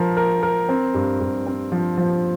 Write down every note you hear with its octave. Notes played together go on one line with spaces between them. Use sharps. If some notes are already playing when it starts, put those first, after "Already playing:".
Already playing: F3 A#4
A#4
A#4
C4
G2
G2
C4
F3
F3